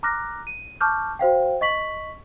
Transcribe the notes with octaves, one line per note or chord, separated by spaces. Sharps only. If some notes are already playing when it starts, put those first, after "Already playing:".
A#5 D6 F6 F#6 A#6
D#7
A5 C#6 D6 F6 G6
F#4 C5 F5 G5
D#5 C#6 B6 F#7